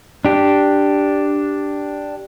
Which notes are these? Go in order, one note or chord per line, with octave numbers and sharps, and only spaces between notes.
D4 G4